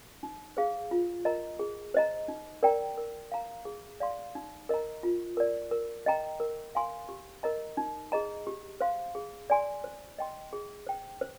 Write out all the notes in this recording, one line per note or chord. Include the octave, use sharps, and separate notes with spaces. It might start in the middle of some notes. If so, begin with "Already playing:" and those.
D#4
G#4 C5 F5
F4
A#4 D#5 A#5
G#4
C5 D#5 A#5
D#4
A#4 D5 G5 A#5
A#4
F5 A#5
G#4
D5 F5 C6
D#4
A#4 D#5 A#5
F4
A#4 D5
A#4
D#5 G5 A#5
A#4
F5 G#5 C6
G4
A#4 D#5 A#5
D#4
G#4 D#5 A#5
G4
C5 F5 C6
G#4
D5 G#5 C6
C5
D#5 G5 C6
G#4
C5 G5
C5